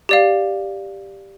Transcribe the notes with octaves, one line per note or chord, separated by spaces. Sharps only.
G4 D5 F5